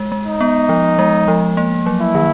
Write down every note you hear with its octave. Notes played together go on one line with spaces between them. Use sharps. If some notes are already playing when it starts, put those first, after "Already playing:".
Already playing: G#3
G#3
D#4
B3
F3
G#3
F3
A#3
F#3
E4
D#3